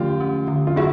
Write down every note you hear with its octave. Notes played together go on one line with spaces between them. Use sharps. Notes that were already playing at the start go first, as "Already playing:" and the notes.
Already playing: D3 F3 A3 C#4 F4 G4
C#4
D3
F4
E4 F#4 G#4